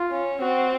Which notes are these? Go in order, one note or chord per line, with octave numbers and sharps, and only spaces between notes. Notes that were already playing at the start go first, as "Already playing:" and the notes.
Already playing: F4
C#4
C4 F#4